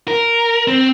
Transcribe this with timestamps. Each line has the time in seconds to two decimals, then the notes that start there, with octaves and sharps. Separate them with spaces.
0.08 A#4
0.68 C4